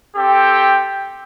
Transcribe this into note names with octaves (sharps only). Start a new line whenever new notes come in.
C4 G4 A4 G5